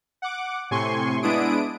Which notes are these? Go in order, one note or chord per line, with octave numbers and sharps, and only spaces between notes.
F#5 D6
A2 C3 G#5 C6 C#6
G#3 B3 D4 E4 D#6 D7